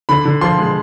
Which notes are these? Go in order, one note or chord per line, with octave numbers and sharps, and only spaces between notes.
D3 B5
D3
F3 C6
G#3